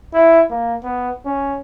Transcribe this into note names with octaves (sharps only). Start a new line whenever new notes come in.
E4
A#3
B3
C#4